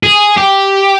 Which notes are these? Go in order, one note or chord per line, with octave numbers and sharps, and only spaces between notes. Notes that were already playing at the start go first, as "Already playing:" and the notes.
G#4
G4